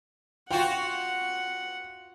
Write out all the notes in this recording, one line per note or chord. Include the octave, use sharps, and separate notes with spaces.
F4 F#4 F#5 G5